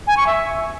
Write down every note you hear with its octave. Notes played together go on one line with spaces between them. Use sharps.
G#5
C#6
E5